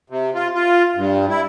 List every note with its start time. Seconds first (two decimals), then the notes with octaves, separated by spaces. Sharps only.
0.10 C3
0.35 F4
0.55 F4
0.96 G2
1.29 E4